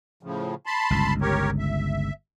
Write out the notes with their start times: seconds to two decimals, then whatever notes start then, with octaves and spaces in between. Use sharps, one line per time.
0.23 A2 C#3 F3
0.66 A5 B5 C6
0.90 G1 C#2
1.21 G4 A#4 C#5
1.59 E5